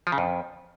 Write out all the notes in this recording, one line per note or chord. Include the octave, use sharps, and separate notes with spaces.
F3
C#3
F2